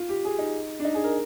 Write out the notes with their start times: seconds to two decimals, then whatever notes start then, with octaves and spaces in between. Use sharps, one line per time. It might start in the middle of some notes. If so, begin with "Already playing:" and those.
Already playing: F4
0.09 G4
0.25 G#4
0.39 D#4
0.80 D4
0.84 D#4
0.94 G#4
1.04 A#4